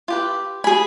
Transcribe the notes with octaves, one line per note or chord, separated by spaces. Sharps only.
F4 G4 B4
G#4 G#5 B5